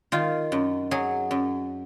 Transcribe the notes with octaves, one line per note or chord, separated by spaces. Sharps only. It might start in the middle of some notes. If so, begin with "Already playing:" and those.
D#3 F4
F#2
F#3 G#4
F#2